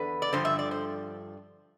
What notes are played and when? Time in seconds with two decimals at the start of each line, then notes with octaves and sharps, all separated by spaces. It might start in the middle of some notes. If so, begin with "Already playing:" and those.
Already playing: E2 D3 B4
0.22 D5
0.33 G2 D3 F3 C5
0.45 E5
0.59 D5
0.71 C5